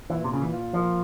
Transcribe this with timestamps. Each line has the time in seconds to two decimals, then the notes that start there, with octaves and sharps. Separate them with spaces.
0.10 A#2 E3
0.24 C3
0.31 A#2 C#3
0.42 E3
0.52 F4
0.73 F3 A#3